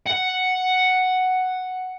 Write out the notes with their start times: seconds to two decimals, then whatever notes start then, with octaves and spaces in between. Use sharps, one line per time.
0.06 F#5